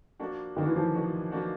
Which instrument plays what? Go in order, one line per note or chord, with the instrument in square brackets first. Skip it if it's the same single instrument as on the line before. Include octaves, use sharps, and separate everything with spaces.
[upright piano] F3 A#3 D4 F#4
[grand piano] D#3 [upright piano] F3 A#3 D4 F#4
[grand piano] E3
F3
[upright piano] F3 A#3 D4 F#4
F3 A#3 D4 F#4